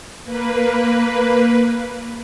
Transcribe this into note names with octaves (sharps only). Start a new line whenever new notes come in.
A#3 B4